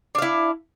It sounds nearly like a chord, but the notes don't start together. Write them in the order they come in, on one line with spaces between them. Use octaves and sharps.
D4 F5 E4